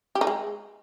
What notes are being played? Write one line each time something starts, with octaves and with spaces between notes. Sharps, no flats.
G4
D#4
G#3